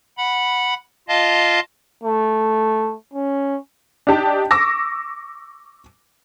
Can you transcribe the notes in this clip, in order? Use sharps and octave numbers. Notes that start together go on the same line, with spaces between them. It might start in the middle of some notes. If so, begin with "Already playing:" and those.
F#5 B5
F4 D#5 F5 A5
A3
C#4
D4 D#4 G4 A5
C#6 D6 E6 A#6